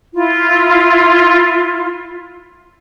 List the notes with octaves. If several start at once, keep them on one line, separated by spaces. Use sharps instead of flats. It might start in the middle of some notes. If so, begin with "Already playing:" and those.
E4 F4